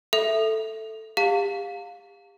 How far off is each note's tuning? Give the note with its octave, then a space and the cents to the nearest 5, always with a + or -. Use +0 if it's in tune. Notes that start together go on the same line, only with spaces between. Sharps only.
A4 +0 E5 +0
G4 +35 F5 +15 A5 +40